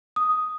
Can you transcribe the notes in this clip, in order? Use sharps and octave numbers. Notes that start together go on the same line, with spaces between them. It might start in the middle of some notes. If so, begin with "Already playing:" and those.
D#6